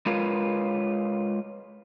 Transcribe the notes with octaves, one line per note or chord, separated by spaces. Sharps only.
G#3 F4 A#4 B4 C#5 F5